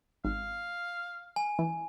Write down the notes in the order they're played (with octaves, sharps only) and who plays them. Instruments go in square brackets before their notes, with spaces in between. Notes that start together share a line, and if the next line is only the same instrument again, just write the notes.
[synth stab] G#1 [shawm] F5
[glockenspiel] G#5
[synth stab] E3